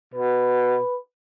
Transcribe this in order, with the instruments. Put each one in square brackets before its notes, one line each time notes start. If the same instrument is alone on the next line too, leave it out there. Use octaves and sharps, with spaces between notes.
[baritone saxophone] B2 [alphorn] B4